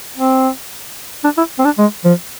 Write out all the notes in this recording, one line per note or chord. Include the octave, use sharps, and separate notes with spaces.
C4
D4
E4
C4
D4
G#3
F3